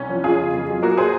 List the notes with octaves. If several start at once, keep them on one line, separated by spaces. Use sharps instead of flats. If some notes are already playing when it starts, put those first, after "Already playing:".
Already playing: C2 C#4
F3
F2 F4 G#4
C#3
F2
F#3
A#3 F#4 A#4
G#4 C5